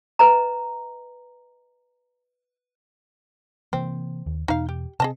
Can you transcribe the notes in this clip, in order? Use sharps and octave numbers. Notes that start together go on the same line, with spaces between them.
B4 D#5 A#5
C3 E3 A#3 C4
D#2
E2 B2 D#4 F5
G4
C3 C4 G#4 D#5 A5